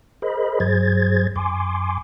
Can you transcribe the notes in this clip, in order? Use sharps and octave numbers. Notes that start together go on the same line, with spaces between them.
G#4 A#4 C5 D#5 B5
G2 F#3 G#4 C5 G#6 A6
F#2 G#5 C6 D6